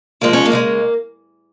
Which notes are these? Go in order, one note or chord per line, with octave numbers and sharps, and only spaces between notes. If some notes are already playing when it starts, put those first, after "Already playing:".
C#3 F3 G#3 A#3
C#4
A#3
C#3 F3 G#3